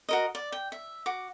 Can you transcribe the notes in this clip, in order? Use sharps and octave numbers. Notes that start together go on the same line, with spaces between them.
F#4 A#4 D#5
D5
G5
E5
F#4 D6